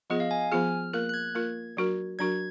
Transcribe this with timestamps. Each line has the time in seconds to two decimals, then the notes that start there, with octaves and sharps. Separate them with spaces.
0.10 F3 B3 F4 G#4 D#5
0.20 F5
0.31 G#5
0.41 G#5
0.52 F3 B3 F4 G#4 F6
0.93 A#3 F4 A#4 F#6
1.09 F#6
1.14 G#6
1.35 A#3 F4 A#4
1.77 F#3 D4 F#4 A#4
2.19 F#3 D4 F#4 A#4 G#6